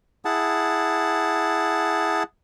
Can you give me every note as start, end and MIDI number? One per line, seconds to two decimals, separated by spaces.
0.25 2.23 64
0.25 2.23 68
0.25 2.23 78
0.25 2.23 81